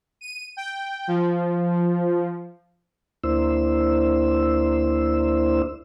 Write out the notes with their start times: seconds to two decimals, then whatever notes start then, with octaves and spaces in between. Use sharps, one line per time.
0.21 D#7
0.57 G5
1.07 F3
3.24 D2 A#3 D4 E4 C5 E6